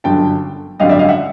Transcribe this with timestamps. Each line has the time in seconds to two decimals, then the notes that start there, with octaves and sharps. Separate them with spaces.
0.04 G1 F#2 D3 G5 A5
0.79 G#1 F#2 D3 G3 D#5 F5
0.89 D5 E5
0.99 D#5 F5
1.09 E5 F#5